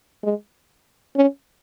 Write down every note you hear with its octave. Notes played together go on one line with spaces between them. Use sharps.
G#3
C#4